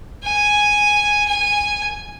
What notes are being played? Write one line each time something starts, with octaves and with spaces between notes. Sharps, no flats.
G#5
G#5